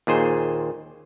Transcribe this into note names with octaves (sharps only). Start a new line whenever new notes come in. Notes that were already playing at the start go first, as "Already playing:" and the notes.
D#2 A#2 G#4 C5